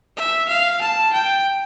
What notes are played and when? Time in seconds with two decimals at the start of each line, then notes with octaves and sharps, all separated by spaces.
0.17 E5
0.48 F5
0.82 A5
1.13 G5